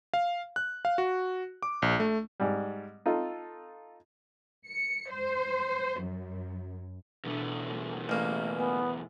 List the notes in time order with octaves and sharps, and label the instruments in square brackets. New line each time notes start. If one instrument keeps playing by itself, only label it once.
[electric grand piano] F5
F#6
F5
F#4
D6
A#1
A3
[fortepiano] G#2 G3
D#4 F4 A4
[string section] C#7
C5
F#2
[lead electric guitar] E2 A3 [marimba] B2 D4
[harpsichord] A1 A#3
[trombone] B3 [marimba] G#5